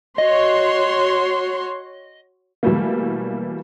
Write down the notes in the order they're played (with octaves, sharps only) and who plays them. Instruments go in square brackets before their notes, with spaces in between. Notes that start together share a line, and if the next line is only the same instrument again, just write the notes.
[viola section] F#4 C#5 C6 [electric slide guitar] D#5
[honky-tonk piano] B2 E3 F#3 G3 A3 A#3